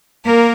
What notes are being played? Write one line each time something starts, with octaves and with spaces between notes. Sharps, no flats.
A#3 A#4